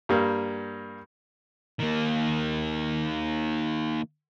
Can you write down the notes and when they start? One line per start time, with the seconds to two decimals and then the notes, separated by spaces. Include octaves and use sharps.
0.09 G2 G3 A#3
1.80 D#3 A#3